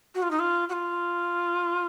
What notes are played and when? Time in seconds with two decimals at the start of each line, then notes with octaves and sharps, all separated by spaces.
0.15 F#4
0.22 F4
0.31 D#4
0.39 F4
0.69 F#4
0.73 F4